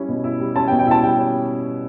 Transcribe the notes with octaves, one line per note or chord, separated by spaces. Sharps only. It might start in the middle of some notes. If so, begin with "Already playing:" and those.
Already playing: G3 C#4 E4
B2
E4
G3
C#4 A5
G5
B2
G5
E4 A5
G3 G5
C#4